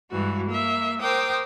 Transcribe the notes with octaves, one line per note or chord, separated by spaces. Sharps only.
G2 E3 G#3 F#4
A#3 E5
A#4 C5 G5 D6 D#6